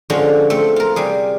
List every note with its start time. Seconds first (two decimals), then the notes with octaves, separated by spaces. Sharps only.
0.10 D3 F3 G#3 C#4
0.50 A3 C4
0.76 F4 A#4
0.96 C3 G3 G#4